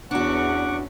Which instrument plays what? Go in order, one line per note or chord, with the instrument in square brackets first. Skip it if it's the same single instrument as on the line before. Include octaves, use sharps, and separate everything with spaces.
[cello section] E2 C#4 [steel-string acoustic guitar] D4 F#4 [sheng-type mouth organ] F#5 C#6 D6